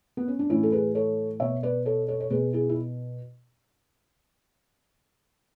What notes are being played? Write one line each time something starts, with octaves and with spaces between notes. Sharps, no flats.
B3
C#4
D4
A2 E3 C#4 E4
A4
G#4 B4
A4 C#5
B2 C#5 E5
B4 D5
A4 C#5
A4 C#5
C#5
B2 G#4 B4
E4 G#4
E4